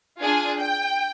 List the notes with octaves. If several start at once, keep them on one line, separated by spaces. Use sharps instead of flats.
D4 F4 G#4 G#5
G5